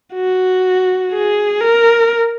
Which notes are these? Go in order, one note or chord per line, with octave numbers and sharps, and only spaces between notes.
F#4
G#4
A#4